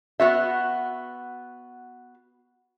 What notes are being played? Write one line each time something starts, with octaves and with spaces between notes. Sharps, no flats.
B3 F#4 E5